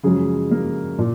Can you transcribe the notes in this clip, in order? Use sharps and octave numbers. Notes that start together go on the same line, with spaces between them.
F#2 C#3 F3 G#3 G#4
A#3 A#4
A#2